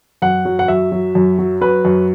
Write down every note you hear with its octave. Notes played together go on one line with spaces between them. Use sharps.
F#2 F#5
F#3
F#5
F#2 E5
F#3
F#2
F#3
F#3 B4
F#2